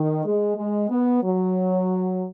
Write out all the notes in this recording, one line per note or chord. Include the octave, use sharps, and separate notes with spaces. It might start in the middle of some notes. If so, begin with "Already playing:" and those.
Already playing: D#3
G#3
G#3
B3
F#3